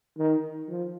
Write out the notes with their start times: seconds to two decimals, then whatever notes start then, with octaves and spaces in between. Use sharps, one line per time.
0.18 D#3
0.69 F3